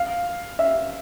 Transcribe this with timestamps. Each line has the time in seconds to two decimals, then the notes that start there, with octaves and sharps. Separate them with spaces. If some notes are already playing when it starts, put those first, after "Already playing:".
Already playing: F5
0.59 E5